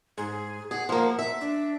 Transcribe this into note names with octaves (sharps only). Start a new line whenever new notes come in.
G#2 G#4
G#4 F#5
F3 A#3
E5
D4